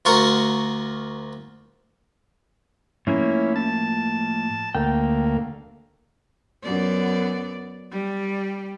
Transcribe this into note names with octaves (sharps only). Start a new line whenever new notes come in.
D2 F4 F#4 A#4 C#6
A2 F3 A#3 C#4 E4
A5
D2 A#3 G5
F#2 B3 D5
G3